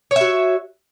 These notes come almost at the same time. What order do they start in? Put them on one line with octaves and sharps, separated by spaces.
C#5 E5 F#4